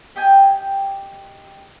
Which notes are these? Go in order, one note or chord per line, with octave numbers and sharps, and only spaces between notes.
G4 D#5 G5 G#5